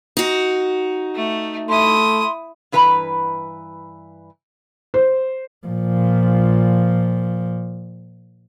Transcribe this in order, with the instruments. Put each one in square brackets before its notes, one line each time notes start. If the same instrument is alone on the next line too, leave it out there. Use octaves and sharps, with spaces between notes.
[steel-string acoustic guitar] D#4 F#4
[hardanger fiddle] A3
[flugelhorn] A3 [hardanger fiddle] E4 D#6 [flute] C6
[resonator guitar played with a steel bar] G2 E3 B4 A5 A#5
[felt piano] C5
[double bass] A#2 F3